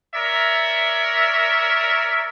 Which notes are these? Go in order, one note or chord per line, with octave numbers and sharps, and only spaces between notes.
A#4 C#5 D5 E5